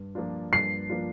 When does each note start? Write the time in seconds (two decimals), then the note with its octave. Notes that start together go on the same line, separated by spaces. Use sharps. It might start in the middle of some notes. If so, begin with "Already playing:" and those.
Already playing: G2
0.15 F3 A#3 D4 F4
0.52 G2 C7
0.90 F3 A#3 D4 F4